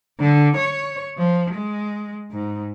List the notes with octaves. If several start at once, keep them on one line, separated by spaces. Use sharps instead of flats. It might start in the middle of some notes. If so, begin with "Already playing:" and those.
D3
C#5
F3
G#3
G#2